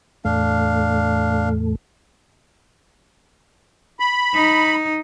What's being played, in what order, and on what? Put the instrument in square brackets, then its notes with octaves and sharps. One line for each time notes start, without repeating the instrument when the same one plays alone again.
[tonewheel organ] E2 A2 A3 [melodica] D4 F5
[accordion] B5
[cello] D#4